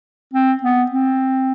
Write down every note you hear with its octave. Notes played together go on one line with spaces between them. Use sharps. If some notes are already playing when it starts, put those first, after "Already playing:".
C4
B3
C4